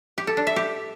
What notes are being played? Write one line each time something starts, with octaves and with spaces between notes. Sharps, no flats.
G4
A4
D4
E5
G4